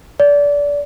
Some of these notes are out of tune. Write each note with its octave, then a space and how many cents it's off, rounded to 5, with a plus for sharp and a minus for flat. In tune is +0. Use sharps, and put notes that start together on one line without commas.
D5 -25